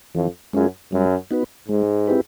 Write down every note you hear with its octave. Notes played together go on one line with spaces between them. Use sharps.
F2 E3
F#2 G#3 C#4 F4 G#4
F#2 G3
B3 D#4 F#4 B4
G#2 G#3
C4 E4 G4 B4